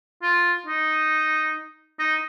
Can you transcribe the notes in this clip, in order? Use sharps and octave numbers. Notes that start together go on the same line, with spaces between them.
F4
D#4
D#4